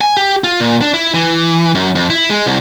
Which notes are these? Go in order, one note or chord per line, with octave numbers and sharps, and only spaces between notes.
G#5
G4
F4
A#2
D4
E4
E3
F#2
F2
E4
G#3
C2